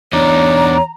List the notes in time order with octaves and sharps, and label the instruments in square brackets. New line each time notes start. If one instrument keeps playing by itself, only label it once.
[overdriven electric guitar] E2 D#4 [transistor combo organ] D4 [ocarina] C#5 [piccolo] A#5